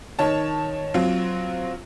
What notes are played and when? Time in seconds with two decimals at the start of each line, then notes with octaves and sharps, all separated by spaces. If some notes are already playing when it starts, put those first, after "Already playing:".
0.19 D#3 C#5 A5
0.94 F#3 C4 F4